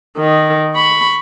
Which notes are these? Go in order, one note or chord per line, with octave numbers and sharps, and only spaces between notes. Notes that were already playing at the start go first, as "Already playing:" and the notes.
D#3
B5 C#6